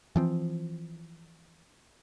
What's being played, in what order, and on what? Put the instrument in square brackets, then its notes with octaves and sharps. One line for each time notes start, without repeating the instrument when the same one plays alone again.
[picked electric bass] E3 F3 C4